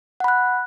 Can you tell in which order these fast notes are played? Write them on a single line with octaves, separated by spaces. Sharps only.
F#5 B5 F#6